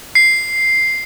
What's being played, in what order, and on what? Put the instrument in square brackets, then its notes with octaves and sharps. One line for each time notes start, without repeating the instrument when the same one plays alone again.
[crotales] C7